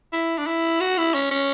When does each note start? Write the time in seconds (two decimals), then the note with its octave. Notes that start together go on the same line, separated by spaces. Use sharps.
0.13 E4
0.38 D4
0.47 E4
0.81 F#4
0.98 E4
1.14 C#4
1.31 C#4